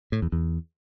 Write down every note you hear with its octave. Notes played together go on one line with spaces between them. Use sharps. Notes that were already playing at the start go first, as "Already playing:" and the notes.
A2
E2
E2